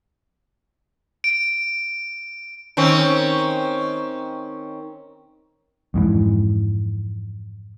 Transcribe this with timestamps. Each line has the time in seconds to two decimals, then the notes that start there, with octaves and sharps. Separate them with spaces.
1.24 D7
2.77 D#3 C4 C#4
5.94 F2 G#2 E3